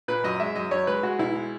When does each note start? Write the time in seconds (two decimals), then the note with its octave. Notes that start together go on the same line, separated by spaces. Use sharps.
0.08 A#2 B4
0.24 F#2 D#5
0.40 G#3 E5
0.55 F#2 D#5
0.71 F#2 C#5
0.87 G#3 B4
1.03 G#3 F#4
1.19 B1 E4
1.35 G#3